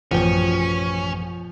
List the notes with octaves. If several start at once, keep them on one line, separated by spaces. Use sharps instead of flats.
A1 F#2 B2 F3 C#4 F4 F#5 G5